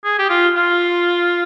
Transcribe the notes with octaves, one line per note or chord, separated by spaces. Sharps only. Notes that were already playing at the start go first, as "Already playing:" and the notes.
G#4
G4
F4
F4